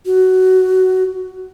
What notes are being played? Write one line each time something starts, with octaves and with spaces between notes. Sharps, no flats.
F#4